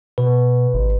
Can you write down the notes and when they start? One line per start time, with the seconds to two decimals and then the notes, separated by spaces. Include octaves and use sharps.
0.18 B2 B4
0.73 G#1